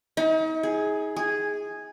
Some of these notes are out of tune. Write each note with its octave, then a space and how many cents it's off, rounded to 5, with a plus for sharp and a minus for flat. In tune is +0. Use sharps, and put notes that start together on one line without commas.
D#4 +40
G#4 +5
G#4 -5